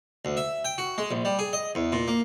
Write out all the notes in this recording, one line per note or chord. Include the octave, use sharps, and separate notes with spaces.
D2
E5
G5
F#4
G#3
A#1
G3
G#4
D#5
E2
A#2
A#3